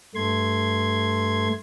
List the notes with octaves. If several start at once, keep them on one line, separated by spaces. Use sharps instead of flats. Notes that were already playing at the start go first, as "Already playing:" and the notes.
G2 A3 C6 G#6